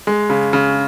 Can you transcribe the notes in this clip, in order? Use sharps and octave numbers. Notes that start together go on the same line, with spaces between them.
G#3
C#3
C#3